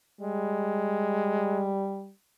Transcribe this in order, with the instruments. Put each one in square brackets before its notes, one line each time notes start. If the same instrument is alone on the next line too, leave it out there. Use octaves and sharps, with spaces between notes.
[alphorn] G3 [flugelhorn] G#3